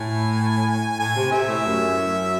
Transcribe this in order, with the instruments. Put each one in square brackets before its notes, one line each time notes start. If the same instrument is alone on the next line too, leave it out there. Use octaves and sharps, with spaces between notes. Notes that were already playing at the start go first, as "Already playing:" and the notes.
Already playing: [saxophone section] A2 [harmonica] G#5
[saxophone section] A2 [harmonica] G#5
[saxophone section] C3
[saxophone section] C3 [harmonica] E5
[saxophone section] A2
F#2